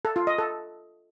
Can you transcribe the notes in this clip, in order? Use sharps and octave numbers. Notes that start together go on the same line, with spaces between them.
A4
F4
D#5
A4